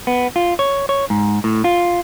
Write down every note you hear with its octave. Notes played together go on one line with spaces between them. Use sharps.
B3
F4
C#5
C#5
G#2
A2
F4